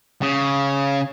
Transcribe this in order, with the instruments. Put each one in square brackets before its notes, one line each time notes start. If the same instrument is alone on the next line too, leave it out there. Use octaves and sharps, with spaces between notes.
[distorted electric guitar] C#3